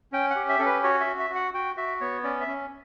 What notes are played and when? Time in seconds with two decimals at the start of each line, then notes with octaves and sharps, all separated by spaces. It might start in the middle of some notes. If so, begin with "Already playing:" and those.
0.12 C#4 G5
0.30 F#5
0.36 G4
0.49 E5
0.59 C#4 A4
0.66 B4
0.83 F#4 C#5
1.00 E5
1.06 F#4
1.19 E5
1.30 F#4
1.35 F#5
1.54 F#4 G5
1.77 F#4 E5
2.01 B3 C#5
2.23 C#4 D5
2.41 E5
2.48 C#4